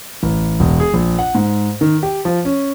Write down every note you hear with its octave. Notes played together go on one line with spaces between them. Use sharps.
A1
E1
G#4
A#1
F#5
G#2
D#3
G4
F3
C#4